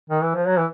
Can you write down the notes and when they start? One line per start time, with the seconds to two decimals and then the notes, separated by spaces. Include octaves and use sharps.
0.10 D#3
0.22 E3
0.35 F3
0.47 F#3
0.58 E3